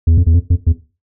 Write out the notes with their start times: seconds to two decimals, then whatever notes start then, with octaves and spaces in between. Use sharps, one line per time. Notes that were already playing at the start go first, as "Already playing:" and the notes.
0.07 E2
0.18 F2
0.27 E2
0.34 F2
0.50 F2
0.67 E2